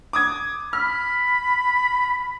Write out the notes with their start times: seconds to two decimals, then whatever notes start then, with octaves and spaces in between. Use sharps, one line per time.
0.13 D6 D#6 G#6
0.73 B5 F6